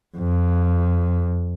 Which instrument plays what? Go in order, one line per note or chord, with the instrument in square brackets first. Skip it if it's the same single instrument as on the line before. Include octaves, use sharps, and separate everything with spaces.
[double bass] F2